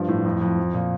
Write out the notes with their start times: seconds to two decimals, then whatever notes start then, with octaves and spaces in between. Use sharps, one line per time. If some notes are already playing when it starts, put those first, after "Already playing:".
Already playing: G2 F3
0.08 A2
0.24 F2
0.41 F2
0.58 F3
0.74 A#2